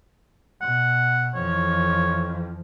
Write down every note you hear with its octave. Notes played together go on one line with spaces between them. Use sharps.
B2 F#5
F2 E3 C#5